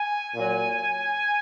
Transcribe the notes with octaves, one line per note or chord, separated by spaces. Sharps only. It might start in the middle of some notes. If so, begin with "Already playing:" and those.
Already playing: G#5
A#2 F#3